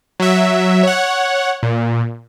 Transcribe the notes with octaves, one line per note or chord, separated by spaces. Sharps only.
F#3 E5
C#5 F#5
A#2